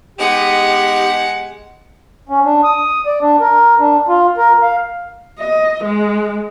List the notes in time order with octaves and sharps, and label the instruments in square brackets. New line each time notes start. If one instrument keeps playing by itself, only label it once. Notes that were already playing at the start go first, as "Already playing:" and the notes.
[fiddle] G#3 F#5 [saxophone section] B3 D#4 G4
[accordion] C#4
D4
D#6
D5
D4
A#4
D4
F4
A#4
F5
[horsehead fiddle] D#5
G#3